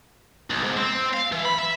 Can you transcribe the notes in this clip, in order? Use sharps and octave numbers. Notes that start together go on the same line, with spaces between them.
B1
G#2
C4
F5
E3
B5
E5